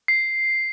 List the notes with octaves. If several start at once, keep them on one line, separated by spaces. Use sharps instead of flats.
C7